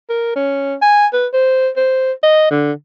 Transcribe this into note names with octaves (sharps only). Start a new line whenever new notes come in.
A#4
C#4
G#5
B4
C5
C5
D#5
D3